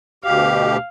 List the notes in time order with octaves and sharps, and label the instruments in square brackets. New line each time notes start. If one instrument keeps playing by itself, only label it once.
[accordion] D2 B2 G4 [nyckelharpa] F5